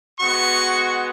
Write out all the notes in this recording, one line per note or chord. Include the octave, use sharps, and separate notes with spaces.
G#3 B3 F#4 C#6